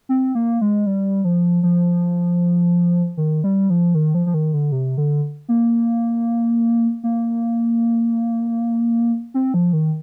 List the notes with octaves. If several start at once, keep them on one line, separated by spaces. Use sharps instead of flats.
C4
A#3
G#3
G3
F3
F3
D#3
G3
F3
D#3
F3
F3
D#3
D3
C3
D3
A#3
A#3
C4
F3
D#3